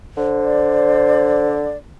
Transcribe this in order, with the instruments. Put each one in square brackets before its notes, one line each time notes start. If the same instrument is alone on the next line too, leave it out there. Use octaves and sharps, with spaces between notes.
[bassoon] D3 [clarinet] C5
[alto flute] D5